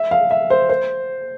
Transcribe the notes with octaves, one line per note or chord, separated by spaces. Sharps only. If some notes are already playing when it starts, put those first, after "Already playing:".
Already playing: E5
F5
E5
C5
C5